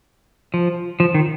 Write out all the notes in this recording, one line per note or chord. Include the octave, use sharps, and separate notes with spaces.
F3
F3
D#3